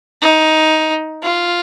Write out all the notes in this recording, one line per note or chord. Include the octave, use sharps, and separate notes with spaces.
D#4
F4